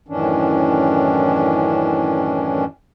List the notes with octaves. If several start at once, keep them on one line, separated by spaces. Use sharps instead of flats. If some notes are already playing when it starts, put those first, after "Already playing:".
F#2 A2 D#3 E3 C#4 D4